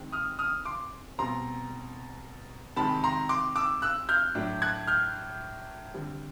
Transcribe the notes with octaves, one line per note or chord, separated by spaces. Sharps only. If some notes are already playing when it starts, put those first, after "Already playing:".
Already playing: C3 D#3 G#3 C4
D#6 F6
D#6 F6
C6 D6
B2 G3 C4 A#5 C6
C3 D#3 G#3 C4 A5 B5
A#5 C6
C6 D6
D6 E6
E6 F#6
F6 G6
A2 F#3 A3 D4
F#6 G#6
F6 G6
D3 G3 C4